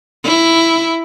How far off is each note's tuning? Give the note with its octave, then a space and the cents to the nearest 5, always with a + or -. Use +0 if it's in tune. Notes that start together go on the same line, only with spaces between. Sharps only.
E4 +5